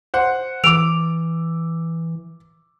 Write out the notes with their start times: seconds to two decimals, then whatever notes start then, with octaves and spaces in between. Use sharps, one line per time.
0.14 C5 F#5
0.64 E3 D6 E6 D7 F7